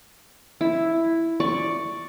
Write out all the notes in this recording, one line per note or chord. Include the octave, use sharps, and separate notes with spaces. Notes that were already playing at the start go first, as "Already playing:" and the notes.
E4
D5 C#6